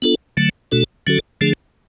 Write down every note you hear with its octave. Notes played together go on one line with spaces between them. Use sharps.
B3 D4 F4 A4
D3 F#3 A3
B2 A3 D4 F#4 A4
D3 F#3 C#4 F#4 A4
D3 F3 A3 D4 G#4